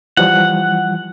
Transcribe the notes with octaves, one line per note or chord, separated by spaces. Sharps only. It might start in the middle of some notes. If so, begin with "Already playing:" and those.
E3 F3 G3 F#5